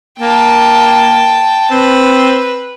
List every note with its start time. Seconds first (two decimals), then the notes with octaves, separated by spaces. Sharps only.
0.20 A#3 G5 A5
1.71 C4 B4